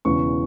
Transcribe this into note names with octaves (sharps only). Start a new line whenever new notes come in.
E1 E2 C#3 E3 C#6